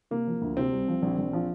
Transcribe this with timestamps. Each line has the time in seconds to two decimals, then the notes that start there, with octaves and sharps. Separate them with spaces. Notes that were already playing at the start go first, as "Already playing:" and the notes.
0.11 C3 A#3
0.27 F3
0.41 D2
0.57 C3 C4
0.72 C2
0.88 F3
1.02 A#1
1.18 A#1
1.33 F3